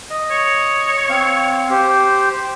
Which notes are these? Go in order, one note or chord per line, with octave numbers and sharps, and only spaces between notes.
D#5
C#5
C4 F5
G4 C5